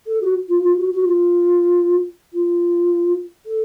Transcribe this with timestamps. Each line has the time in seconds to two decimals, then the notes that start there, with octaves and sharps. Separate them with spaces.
0.06 A4
0.21 F#4
0.48 F4
0.62 F4
0.77 F#4
0.92 F#4
1.05 F4
2.33 F4
3.46 A4